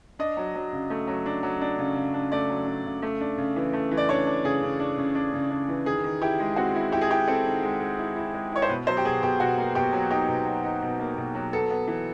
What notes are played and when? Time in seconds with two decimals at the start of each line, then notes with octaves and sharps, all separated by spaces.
0.19 D4 D#5
0.37 F#3
0.55 F#3
0.72 C#3
0.90 A3
1.07 F#3
1.26 D4
1.43 F#3
1.61 D4
1.79 C#3
1.96 C#3
2.14 D4
2.32 A3 D5
2.49 F#3
2.67 D4
2.85 C#3
3.02 A3
3.21 D4
3.38 C#3
3.56 E3
3.73 A3
3.91 E3
3.97 D5
4.09 D4 C#5
4.27 D4
4.44 C#3 G#4
4.62 C#3
4.80 D4
4.98 C#3
5.15 D4
5.33 C#3
5.51 D4
5.69 E3
5.86 D#3 G#4
6.04 D#3
6.22 E4 G4
6.40 G#3
6.56 C4 F#4
6.75 E4
6.92 E4 G4
7.01 G#4
7.10 E4 G4
7.28 C4 A4
7.45 D#3
7.63 G#3
7.80 G#3
7.98 E4
8.16 E4
8.34 G#3
8.52 E4 C#5
8.62 C5
8.69 B2 B4
8.87 F#3 C5
8.97 G4
9.05 B2 G#4
9.23 B2 G4
9.40 B2 F#4
9.58 A#3
9.75 B2 G4
9.93 F#3
10.11 D#4 G4
10.28 B2
10.46 F#3
10.64 D#4
10.82 B2
10.99 A#3
11.18 B2
11.35 F#3
11.53 B3 A4
11.70 B3
11.88 E3